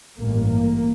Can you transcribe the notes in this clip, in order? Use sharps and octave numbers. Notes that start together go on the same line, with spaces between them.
A1 G2 A#3
A#3